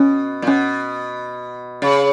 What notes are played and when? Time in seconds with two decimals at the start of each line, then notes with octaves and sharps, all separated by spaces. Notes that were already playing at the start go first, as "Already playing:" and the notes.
Already playing: B2 C#4
0.42 A#2
0.47 B2 C#4
1.82 C#3